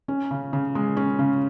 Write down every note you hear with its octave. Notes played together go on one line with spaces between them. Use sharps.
C#4
C#3
C#3
G#3
C#4
C#3